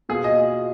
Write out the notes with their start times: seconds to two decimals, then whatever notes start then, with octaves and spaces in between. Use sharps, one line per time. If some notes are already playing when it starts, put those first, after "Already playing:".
0.09 B2 A#3 F4 G#4
0.24 D#5